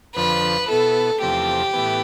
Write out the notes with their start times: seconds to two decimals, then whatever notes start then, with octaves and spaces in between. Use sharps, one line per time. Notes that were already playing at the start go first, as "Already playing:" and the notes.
0.16 F2 D3 F3 B4
0.68 B2 B3 E4 A4
1.21 E2 C3 F3 A3 G4
1.73 A2 E3 B3